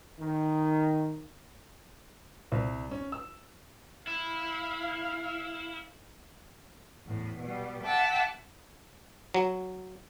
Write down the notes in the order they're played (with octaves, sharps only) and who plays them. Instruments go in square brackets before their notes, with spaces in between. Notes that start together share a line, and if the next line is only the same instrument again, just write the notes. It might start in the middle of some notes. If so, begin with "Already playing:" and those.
[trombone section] D#3
[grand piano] C2
C#4
E6
[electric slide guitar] E4 [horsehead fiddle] F5
[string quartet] E2 A2
B2 G3
E5 F#5 G5 A5 D6 E6
[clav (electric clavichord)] F#3